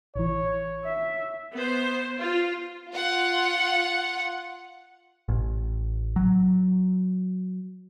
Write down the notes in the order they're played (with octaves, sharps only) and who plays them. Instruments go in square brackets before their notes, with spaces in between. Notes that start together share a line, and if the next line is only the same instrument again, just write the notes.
[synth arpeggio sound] A1 E3 [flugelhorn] C#5
[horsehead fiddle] E5
[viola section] B3 C5
F4
[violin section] F4 F#5
[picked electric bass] A1
F#3